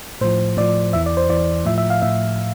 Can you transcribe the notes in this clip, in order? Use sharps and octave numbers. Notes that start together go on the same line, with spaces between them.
A2 F3 C5
A2 F3 D5
E2 E3 E5
D5
C5
E2 E3 D5
A2 F3 E5
E5
F5
A2 E5